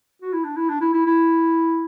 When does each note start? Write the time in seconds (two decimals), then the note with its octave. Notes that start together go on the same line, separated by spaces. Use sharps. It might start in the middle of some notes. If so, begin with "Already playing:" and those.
0.22 F#4
0.33 E4
0.44 D4
0.56 E4
0.69 D4
0.81 E4
0.94 E4
1.06 E4